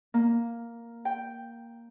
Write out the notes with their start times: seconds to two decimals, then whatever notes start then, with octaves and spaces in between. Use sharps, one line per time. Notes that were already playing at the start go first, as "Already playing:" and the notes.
0.14 A#3
1.05 G5